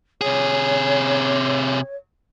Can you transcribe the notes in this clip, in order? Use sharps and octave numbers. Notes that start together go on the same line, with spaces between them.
C3 G#4 C#5